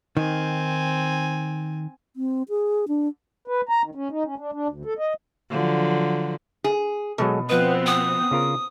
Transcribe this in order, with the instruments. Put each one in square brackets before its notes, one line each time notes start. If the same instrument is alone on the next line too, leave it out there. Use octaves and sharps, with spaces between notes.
[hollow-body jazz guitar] D#3 [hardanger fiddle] C4 G#5
[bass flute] C4
G#4
D4
[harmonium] B4
A#5
D#3
C#4
D#4
C#4
D4
D4
D2
A4
D#5
[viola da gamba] D3 F3 F#3
[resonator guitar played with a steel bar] G#4
[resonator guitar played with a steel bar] B2 [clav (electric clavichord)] F#3 G#3 A4
[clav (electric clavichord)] F3 D#5 [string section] B3 C4 [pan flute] B4
[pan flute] D#6
[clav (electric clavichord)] C#3 F4 A#4